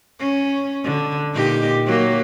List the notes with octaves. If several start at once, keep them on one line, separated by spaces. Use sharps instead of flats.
C#4
D3
A#2 D#4 G4
F#3 A#3 G4